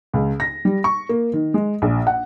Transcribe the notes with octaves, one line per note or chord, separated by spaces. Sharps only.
C#2
A#6
G3
C#6
A#3
D#3
G#3
A#1
F#5